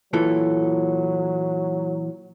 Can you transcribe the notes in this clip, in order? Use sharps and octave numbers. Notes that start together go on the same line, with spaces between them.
A#2 E3 F#3 A4